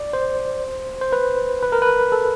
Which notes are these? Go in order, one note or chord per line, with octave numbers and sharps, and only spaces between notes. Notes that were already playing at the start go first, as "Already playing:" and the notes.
Already playing: D5
C5
C5
B4
B4
A#4
B4
A4